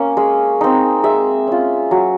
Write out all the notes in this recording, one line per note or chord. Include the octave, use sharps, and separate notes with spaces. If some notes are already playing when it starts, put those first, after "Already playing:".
Already playing: A#3 C#4
G#3
C4 D#4
G#3 E5
C#4 F4
F#3